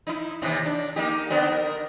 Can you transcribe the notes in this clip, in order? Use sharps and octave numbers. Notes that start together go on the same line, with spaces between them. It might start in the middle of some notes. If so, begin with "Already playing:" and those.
D#4 E4
D#2 C3 E3
D4
A#3 D#4 G4
D3 B3 C4
A#4